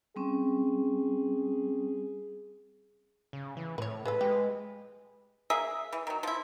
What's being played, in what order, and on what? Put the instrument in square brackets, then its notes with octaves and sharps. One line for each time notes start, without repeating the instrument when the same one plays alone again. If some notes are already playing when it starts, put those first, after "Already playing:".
[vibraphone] G3 C4 C#4 [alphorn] G#4
[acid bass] C#3
E3
[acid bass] A2 [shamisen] B4 C#5
[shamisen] G#3 F4 A4 [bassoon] B4
[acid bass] G#3 [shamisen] G4
[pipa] A#3 G#4 E5
E3
D#3 F#3
F3 E4